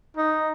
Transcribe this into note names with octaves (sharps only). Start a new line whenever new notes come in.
D#4